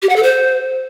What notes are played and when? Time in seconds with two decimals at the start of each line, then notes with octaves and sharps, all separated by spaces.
0.02 G4
0.09 F#5
0.16 A4
0.23 C5